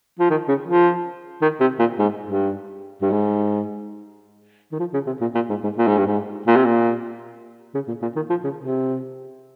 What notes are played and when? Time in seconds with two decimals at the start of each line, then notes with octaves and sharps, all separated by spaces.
0.19 F3
0.30 D#3
0.48 C#3
0.67 F3
1.42 D#3
1.60 C3
1.79 A#2
1.99 G#2
2.26 G2
3.02 G2
3.11 G#2
4.72 D#3
4.79 F3
4.94 C#3
5.07 C3
5.21 A#2
5.35 A#2
5.49 G#2
5.64 G#2
5.78 A#2
5.87 G#2
5.97 G2
6.06 G#2
6.47 A#2
6.56 C3
6.65 A#2
7.74 C#3
7.88 A#2
8.02 A#2
8.16 D#3
8.30 F3
8.44 C#3
8.58 C3